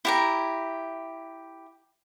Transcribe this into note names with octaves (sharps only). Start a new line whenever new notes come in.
E4 G4 A#5